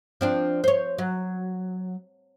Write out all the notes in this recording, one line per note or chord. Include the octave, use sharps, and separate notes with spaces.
F3 C4 D4
C5 C#5
F#3